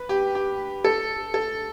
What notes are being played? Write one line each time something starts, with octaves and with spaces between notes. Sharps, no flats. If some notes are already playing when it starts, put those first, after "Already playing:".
Already playing: B4
G4
G4
A4
A4